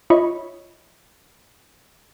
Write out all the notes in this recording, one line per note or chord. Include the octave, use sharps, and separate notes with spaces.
F4 C#5 D#5 E5 B5 C#6